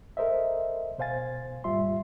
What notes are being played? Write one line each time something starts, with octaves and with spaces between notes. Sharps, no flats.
A4 A#4 C5 D#5 E5
B2 C5 F5 G#5 A6
D#2 G#2 G3 F4 E5 C6